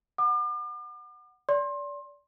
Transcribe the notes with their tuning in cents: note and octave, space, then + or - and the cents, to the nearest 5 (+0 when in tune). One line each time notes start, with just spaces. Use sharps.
F#5 +0 D6 +40
D5 -30 C6 +25